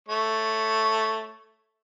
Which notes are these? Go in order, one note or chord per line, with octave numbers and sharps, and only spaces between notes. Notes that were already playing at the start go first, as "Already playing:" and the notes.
A3 C#5